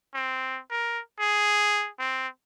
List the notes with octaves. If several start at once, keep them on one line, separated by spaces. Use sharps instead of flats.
C4
A#4
G#4
C4